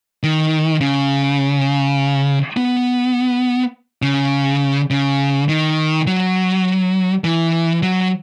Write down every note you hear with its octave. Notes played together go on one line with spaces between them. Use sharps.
D#3
C#3
B3
C#3
C#3
D#3
F#3
E3
F#3